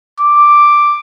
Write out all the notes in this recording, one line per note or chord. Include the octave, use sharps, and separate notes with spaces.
D6